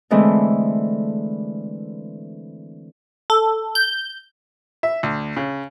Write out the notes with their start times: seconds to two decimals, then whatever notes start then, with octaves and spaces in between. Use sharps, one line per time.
0.10 D3 E3 G#3 A3 C4
3.30 A4
3.75 G6
4.83 E5
5.03 D2
5.37 C#3